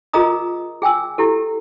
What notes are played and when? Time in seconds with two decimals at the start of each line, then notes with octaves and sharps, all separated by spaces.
0.13 F4 G#4 A#4 D#5 A#5 D#6
0.82 G#4 G5 G#5 E6
1.18 E4 G4 A4